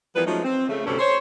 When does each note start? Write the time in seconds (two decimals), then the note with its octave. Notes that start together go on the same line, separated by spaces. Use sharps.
0.15 E3 F3 G3 B3 A#4 B4
0.26 F3 F#3 G#3 A3 C#4 D#4
0.44 C4
0.68 C#3 A3
0.85 D2 G2 C3 C#4 A4
0.99 C5 C#5